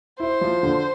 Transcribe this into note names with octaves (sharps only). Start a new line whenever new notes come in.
E4 C5
F3
D3